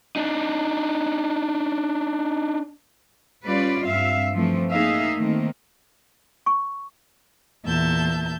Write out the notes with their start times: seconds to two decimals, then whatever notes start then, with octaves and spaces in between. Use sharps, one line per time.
0.16 D4 D#4
3.45 G3 C#4 F4 B4 D5
3.86 G2 C4 E5 F5
4.34 E3 F3 A3 C4
4.71 A#3 D#4 G#4 E5 F5
5.18 D#3 A3 A#3 C4
6.46 C#6
7.65 E2 A#2 E5 A5 G6